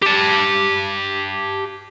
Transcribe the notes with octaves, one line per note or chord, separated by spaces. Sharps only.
G4 A5